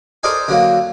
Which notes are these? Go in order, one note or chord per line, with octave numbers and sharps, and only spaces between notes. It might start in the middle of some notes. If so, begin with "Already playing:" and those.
A4 A#4 C5 D5 D#5 G#5
D3 F#3 A#3